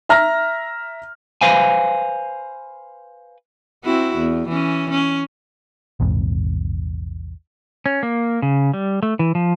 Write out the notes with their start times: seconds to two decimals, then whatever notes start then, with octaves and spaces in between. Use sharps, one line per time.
0.09 E5 A#5 F6 A#6
1.41 B4 C5 F5 G#5
3.85 C4 E4 F#4
4.17 E2
4.49 E3 C#4
4.91 C#4
6.00 A#1 E2 G#2 C3
7.86 C#4
8.03 A#3
8.42 C#3
8.74 G3
9.03 A3
9.19 E3
9.35 F3